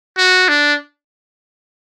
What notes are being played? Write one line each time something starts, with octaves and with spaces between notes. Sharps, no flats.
F#4
D4